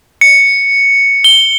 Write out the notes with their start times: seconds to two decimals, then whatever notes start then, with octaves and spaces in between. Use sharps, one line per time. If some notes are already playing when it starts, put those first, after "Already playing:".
0.21 C#7
1.24 G7